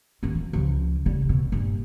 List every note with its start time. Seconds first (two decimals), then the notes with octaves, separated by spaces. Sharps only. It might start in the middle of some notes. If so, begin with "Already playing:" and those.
0.23 D#3 C#4
0.35 F3
0.53 C#2 F3
1.06 C#3 G3
1.29 B2
1.52 G2 A#2